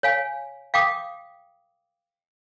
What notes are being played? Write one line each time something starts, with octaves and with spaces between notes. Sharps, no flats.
C#5 F5 G#5
F5 G5 D6 D#6